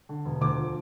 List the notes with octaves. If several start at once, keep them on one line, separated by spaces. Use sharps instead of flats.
D3
E1
D2 D6
F3